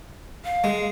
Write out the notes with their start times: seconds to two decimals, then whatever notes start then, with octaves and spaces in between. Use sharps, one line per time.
0.45 F5
0.64 G#3